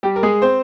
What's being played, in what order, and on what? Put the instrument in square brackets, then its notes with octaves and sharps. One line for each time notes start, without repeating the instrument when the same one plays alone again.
[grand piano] G3 G4
A#4
G#3 G#4
C4 C5